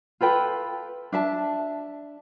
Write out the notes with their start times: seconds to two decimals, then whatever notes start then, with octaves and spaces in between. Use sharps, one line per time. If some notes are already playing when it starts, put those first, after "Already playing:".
0.21 F4 A4 B4 G5
1.12 D4 E5 A5